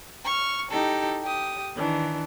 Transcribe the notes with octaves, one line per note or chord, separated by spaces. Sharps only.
C#6 F6
D#4 E4 G4 A4
G4 D#6
D#3 E3 D4